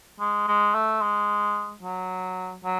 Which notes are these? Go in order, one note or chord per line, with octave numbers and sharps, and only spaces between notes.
G#3
G#3
A3
G#3
F#3
F#3